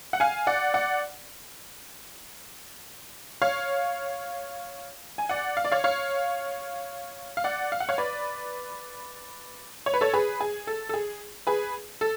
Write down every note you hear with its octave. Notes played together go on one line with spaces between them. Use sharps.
F#5
F5 G#5
D5 F#5
D5 F#5
C#5 F5
G#5
D5 F#5
F5
D5
C#5 F5
C#5 F5
F5
D5 F#5
F5
F#5
C#5 F5
B4 D5
C#5
B4
A4 C#5
G#4 B4
G#4
A4
A4
G#4
G#4 B4
A4